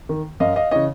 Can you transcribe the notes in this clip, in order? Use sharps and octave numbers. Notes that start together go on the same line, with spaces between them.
D#3
F#2 D#5 F5
D#5 F5
C#3 E3 C#5 D#5